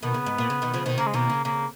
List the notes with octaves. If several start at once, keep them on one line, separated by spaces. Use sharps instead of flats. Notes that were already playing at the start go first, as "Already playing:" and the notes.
B2 D#3 B3
C#3
G#2
A#2
C#3
B2 D#3
C#3 F3
B2 D#3
C#3 A#3
G#3
B2 D#3 A#3
C#3
C#3 A#3